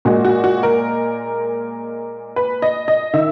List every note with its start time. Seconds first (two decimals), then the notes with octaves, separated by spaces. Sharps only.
0.05 A#2 G#3 F#4
0.25 F#4
0.44 F#4
0.63 A#4
2.36 B4
2.62 D#5
2.88 D#5
3.14 D#3 E5